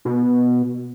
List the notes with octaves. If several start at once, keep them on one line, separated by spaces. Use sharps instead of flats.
B2